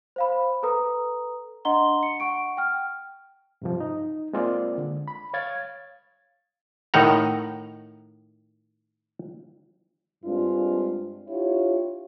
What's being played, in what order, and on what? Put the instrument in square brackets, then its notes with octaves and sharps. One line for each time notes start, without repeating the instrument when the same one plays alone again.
[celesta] C5 F5 B5
A4 B4 A#5 D#6
D4 D#5 F#5 A#5 C6 G7
C#7
F#5 C#6 D7
G5 F6
[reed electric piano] G2 C3 F3
D#4
G#3 A#3 C4 F4 G#4 D5
D3
B5
C#5 F5 G#6 A6
[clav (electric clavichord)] A2 D#3 D#4 F#5 A#5
[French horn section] G2 G#3 C4 D4 F4
D4 E4 F4 G4 C#5